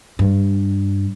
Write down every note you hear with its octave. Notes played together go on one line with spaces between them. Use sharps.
G2